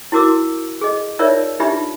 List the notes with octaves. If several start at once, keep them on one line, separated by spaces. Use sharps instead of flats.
E4 F#4 A#4 D6 E6
G#4 D#5
D#4 F4 A#4 C#5 D5 E5
D4 D#4 F4 G4 E5 B5